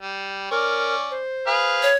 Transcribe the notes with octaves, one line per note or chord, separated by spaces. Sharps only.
G3
C#4 A#4 D5
C5
G#4 B4 F5
C#5